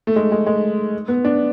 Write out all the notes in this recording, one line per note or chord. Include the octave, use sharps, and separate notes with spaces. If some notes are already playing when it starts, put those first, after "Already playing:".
A3
G#3
G#3
G#3
B3
D4